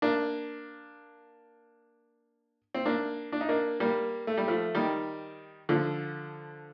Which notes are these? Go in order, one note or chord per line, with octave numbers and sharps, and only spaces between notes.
A#3 D4
C4
A#3 D4
D4
D#4
A#3 D4
G3 A#3
A3
G3
F3 A3
D#3 G3
D3 F3